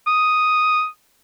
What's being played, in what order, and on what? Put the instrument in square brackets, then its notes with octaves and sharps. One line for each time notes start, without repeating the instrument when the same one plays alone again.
[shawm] D#6